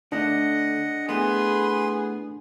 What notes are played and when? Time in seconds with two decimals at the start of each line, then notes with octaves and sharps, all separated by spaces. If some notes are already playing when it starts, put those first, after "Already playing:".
0.12 D3 A3 D4 D#5 F#5
1.09 A2 A3 B3 G#4 B4 B5 C6